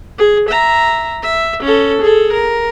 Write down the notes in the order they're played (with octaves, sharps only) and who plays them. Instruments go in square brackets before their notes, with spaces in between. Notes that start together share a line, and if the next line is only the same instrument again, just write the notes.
[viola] G#4
E5 A#5
E5
C#4 A4
G#4 A4
A#4